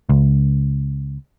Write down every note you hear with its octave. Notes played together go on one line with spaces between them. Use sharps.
C#2